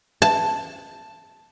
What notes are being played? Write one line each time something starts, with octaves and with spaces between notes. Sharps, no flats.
A5